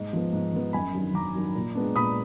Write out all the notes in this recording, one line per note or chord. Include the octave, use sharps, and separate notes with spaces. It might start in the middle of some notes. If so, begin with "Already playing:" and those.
Already playing: G#2
F3 B3
G#2
F3 B3
F#2 G#5 B5
D#3 F#3 D4
F#2 A#5 D6
D#3 F#3 D4
A#2
G#3 B3 D4
A#2 B5 D#6